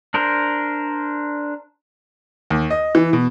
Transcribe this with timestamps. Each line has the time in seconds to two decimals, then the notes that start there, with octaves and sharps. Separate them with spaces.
0.14 D4 A#4 C5
2.50 D#2
2.70 D#5
2.95 E3
3.13 B2